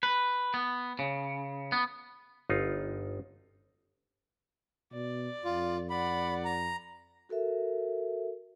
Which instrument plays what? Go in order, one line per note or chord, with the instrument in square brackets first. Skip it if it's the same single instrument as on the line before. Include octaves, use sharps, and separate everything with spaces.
[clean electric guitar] B4
B3
C#3
B3
[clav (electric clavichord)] G1 D#4 F4
[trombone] B2 [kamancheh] D5
[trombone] F2 [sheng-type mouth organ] F4
[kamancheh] D5 F#5 [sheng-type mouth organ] B5
[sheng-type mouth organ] A#5
[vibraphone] F#4 A4 A#4 E5